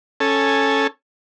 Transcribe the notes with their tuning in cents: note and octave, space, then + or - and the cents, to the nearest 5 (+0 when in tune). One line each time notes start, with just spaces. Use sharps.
C#4 -5 A4 +0 G#5 +0